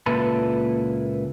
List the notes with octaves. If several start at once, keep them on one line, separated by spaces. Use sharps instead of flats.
C#2 A#2 A#3 E4 A4 B4